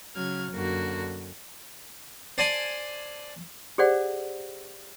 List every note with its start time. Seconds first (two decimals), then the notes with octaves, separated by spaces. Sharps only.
0.14 C#3 F#3 F6 G#6
0.52 F#2 D3 A#3 F#4
2.38 C5 D5 G#5 A5
3.78 G4 G#4 C5 D5 F#5